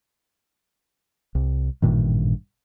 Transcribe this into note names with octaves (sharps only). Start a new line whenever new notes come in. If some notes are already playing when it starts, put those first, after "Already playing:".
C2
A1 G2 A#2 D#3